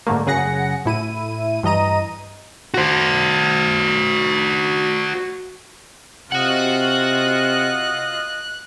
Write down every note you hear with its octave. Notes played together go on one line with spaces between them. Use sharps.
G#2 D3 A3 A#3
F#2 C#3 G#4 F#5 A#6 C#7
A2 E4 D#7
G2 E3 D#5 A#5 D#7
F#4 C5
C3 F4 F#4 D#5 F#5 F#6